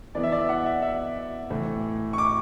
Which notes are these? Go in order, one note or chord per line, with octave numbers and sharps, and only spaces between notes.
E3 B3 D5
E5
D5
E5
F#5
E5
E5
A2 E3 A3
C#6
D6